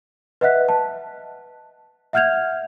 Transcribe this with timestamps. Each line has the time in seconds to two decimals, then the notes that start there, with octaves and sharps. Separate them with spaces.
0.41 B4 D#5 E5 F#5 F#6 B6
0.69 A5
2.13 E5 F#5 F6 G6 G#6 F7